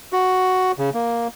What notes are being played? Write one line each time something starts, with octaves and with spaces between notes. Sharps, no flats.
F#4
C#3
A#3